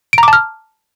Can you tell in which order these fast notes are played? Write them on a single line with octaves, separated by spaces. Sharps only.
D7 A#5 D6 A5 F6